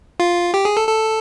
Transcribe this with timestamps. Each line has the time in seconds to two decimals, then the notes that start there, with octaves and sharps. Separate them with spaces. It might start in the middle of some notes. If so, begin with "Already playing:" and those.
0.20 F4
0.54 G4
0.65 G#4
0.77 A4
0.88 A4